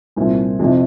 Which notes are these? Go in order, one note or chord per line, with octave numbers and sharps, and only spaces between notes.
C2 A#2 F3 C4 E4
F2 C3 F3 C4 E4